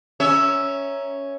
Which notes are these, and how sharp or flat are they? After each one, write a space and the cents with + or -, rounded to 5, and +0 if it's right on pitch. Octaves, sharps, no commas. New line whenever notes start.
C#4 +0 A#4 +0 E5 +0